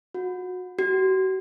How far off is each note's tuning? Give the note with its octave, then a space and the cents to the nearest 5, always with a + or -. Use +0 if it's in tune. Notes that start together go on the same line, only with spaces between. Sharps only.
F#4 -25
F#4 +40